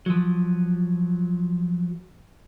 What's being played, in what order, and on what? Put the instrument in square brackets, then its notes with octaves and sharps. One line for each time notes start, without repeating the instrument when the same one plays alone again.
[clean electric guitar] F3 F#3